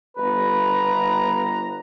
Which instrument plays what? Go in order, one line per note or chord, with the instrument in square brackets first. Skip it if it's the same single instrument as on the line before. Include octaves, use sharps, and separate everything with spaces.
[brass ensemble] G1 A#5 [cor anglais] B4